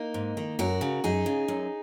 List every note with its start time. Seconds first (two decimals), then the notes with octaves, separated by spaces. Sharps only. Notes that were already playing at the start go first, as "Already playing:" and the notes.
Already playing: A#3 D#4
0.14 G#2
0.37 D#3
0.59 F#2 F#4 A#4
0.81 C#3
1.04 F#2 D#4 G#4
1.26 C#3
1.48 F#2